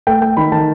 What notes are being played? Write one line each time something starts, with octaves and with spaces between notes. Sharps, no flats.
A3 G5
A3 G5
D#3 B5
D#3 A5